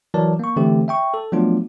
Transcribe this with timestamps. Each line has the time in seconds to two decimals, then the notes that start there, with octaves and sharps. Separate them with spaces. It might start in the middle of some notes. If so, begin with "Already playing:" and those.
0.14 E3 F#3 A#4 D5 A5
0.39 A#3 C#6
0.56 D3 E3 A3 C4 G4
0.88 E5 G5 C#6
1.14 A4
1.32 F3 F#3 A3 B3 D4 F4